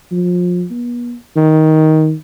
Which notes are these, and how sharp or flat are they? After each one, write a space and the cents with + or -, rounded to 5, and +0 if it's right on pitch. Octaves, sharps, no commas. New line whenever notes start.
F3 +30
B3 -40
D#3 +10